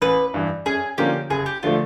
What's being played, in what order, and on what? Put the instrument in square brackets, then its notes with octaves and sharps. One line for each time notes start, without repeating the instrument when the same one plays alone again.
[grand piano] A1 [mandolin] B4
[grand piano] G2 E3
[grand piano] F#2 [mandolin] G#4
[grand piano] D3 F3 A#3 C#4 [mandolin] G4
[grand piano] F#1 [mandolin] G#4
[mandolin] G4
[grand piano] D3 F3 A3 [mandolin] F4